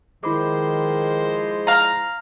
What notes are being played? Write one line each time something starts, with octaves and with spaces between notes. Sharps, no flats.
D#3 F3 G#3 E4 C5 B5 D6
F5 A#5